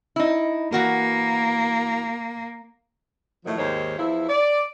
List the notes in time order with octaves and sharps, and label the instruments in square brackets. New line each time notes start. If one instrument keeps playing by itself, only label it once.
[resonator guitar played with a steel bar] D#4 E4
[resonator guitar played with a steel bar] E3 F#4 A#4 [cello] A#3
[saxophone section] A2 D#3 F3 F#3 A3
D#2 G#2 D#3 C5 C#5
E2 F3 E4
D5